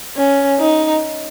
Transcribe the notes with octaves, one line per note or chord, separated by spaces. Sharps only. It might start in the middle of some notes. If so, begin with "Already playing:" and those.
C#4
D#4